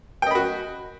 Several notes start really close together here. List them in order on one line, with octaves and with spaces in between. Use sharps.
G5 D#5 B5 F#4